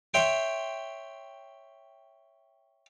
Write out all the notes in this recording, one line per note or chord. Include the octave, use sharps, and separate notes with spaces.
C#5 E5 G5 C6